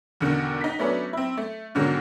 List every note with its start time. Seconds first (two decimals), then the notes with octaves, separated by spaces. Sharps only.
0.21 E2 B2 D3 D#3
0.61 D#4 B6
0.79 F#3 A3 B3 C#4 D4
1.13 C4 E4
1.37 A3
1.75 G#2 B2 D3 D#3 F#3 G#3